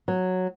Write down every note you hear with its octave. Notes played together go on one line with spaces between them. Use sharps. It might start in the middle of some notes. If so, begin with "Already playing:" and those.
F#3